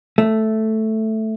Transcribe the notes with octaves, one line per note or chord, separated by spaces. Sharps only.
A3